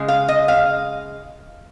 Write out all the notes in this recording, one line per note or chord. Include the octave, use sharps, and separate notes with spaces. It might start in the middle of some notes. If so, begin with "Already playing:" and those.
Already playing: C#3 G#3
F5
D#5
F5